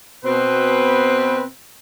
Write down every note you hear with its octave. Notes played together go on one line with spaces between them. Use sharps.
B2 C4 B4